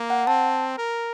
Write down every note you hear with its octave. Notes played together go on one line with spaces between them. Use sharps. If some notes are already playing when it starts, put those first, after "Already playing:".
Already playing: A#3
F#5
C4 A5
A#4